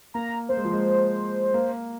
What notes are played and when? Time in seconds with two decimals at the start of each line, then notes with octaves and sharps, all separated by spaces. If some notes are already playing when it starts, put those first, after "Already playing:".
0.14 A#3 A#5
0.49 A#3 C5
0.57 G#3
0.64 F3
0.72 G#3
1.54 A#3